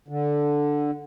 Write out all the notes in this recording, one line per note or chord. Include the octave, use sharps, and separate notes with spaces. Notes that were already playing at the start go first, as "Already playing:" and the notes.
D3